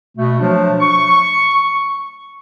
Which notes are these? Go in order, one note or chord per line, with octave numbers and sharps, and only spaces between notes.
B2 A3
F3 F#3 A3 D4
C#6